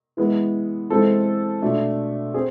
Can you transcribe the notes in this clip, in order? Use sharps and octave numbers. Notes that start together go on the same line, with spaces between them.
E3 G#3 B3
E3 G#3 C4 F4 A4
B2 A3 D4 F4
C4 G#4